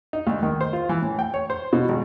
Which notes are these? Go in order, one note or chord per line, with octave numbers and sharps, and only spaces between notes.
D#4
D2
D#3
C5
F4
E3
A2
G5
C#5
C5
B2
G#1